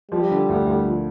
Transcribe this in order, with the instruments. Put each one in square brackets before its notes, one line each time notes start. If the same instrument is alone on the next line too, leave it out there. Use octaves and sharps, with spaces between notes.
[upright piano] F3 [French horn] G3
[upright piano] D3
D2
D2
F3